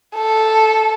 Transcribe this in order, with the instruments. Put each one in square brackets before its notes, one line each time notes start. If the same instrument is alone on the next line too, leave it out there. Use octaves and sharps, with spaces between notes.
[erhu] A4